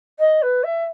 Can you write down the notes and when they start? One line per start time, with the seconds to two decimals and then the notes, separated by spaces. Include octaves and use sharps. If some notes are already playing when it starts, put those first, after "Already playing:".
0.19 D#5
0.42 B4
0.64 E5